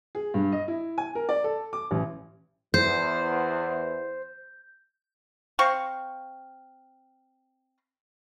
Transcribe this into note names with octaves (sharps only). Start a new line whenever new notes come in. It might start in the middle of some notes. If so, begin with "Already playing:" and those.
G#4
G2
D#5
E4
G#5
A#4
D5
A4
D6
A1
E2 C5 G6
C4 F5 C#6